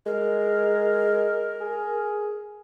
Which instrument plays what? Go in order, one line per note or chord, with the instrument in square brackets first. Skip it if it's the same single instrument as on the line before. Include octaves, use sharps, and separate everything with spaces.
[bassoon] G#3 [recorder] A#4
[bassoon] G#4